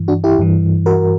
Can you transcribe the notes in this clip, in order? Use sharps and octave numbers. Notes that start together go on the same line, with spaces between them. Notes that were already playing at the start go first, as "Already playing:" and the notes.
Already playing: G2 E3
D4 F#4
E4 G4
G2 E3
F#4 A#4